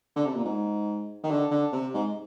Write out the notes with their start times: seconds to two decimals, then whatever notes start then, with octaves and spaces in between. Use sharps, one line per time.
0.16 D3
0.26 C3
0.35 A#2
0.45 G#2
1.23 D#3
1.30 D3
1.51 D3
1.72 C3
1.94 G#2